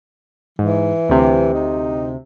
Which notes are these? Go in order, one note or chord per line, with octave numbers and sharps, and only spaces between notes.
G#2 E3
D2 C3
D#4